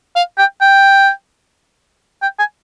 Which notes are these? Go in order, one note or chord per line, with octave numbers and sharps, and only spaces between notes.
F5
G5
G5
G5
G#5